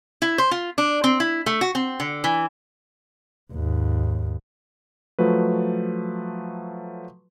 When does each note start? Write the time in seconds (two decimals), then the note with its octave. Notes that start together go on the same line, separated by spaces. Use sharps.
0.22 E4
0.38 C5
0.51 F4
0.78 D4
1.04 C4
1.20 E4
1.46 A3
1.61 F#4
1.75 C4
2.00 D3
2.24 E3
3.53 D#2 G#2
5.19 F3 F#3 A3 B4